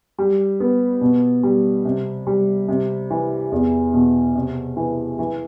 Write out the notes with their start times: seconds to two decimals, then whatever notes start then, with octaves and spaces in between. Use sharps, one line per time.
0.18 G3
0.60 B3
1.01 B2
1.43 G3
1.85 C3
2.27 G3
2.68 C3
3.11 E3
3.52 E2
3.94 B2
4.35 C3
4.77 E3
5.19 E3